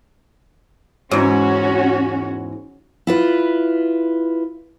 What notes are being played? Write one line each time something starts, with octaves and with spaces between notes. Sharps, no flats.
E2 G#2 C#4 F#4
E4 F4 B4